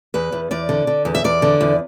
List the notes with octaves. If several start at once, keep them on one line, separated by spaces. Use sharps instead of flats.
E2 B4
E2
E2 D5
D3
D3
E2
E5
E2 D5
D3
E2